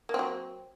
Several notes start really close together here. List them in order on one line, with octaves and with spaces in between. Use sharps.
A#3 C4 F#3